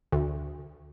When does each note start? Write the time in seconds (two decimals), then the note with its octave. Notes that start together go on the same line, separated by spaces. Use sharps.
0.12 D2